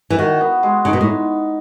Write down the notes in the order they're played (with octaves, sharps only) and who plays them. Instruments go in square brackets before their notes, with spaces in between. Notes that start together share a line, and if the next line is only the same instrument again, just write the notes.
[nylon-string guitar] E3
[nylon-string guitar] D#3 [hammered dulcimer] F#4
[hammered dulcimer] B3
G#3
[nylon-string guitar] C#3 [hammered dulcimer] D#4
[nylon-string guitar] B2
A2